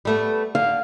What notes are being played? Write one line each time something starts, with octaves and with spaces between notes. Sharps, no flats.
G3 A3 B3
D3 F5